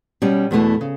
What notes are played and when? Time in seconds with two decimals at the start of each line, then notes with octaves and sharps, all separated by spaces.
0.22 B2 G3 C#4
0.51 E2 B2 A3 E4
0.81 C#3